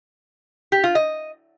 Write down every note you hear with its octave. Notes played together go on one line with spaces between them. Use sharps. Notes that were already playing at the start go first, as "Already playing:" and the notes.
G4
F4
D#5